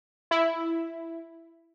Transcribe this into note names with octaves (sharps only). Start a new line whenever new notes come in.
E4